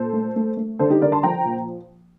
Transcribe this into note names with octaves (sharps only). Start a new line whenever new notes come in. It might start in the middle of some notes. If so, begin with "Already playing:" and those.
Already playing: A#2 A4 C5
A3
A3
A3
D3 A4 C5
D#4 G4
D3 A#4 D5
A5 C6
F3 G5 A#5
A#2